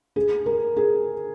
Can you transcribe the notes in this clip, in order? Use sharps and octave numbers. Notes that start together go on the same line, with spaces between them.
G#4
A#4
G#4